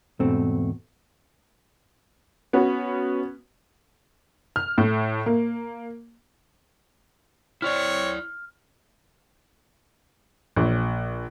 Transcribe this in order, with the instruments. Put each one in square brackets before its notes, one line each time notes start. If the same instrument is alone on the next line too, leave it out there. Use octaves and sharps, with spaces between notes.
[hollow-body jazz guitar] E2 G#2 B2 A3 C4
[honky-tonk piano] B3 C#4 F#4
F6
A2
A#3
[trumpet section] C4 C#5 [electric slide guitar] E4 D5 [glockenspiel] F6
[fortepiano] A#1